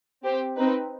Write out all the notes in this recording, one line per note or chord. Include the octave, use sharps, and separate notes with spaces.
C4 G4 C5
C4 D#4 B4